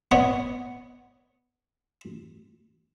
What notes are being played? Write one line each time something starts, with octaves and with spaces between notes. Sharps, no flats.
B3 C#5 D#5